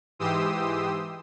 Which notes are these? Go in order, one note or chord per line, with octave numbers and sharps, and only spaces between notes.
G#2 E3 G4 C6 D#6 E6